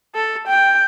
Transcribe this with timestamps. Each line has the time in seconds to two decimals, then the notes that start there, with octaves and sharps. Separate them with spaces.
0.15 A4
0.47 G5